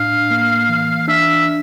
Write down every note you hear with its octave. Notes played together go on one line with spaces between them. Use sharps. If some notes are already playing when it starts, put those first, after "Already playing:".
Already playing: A2 D4 F5
A#3
E3
D4 E5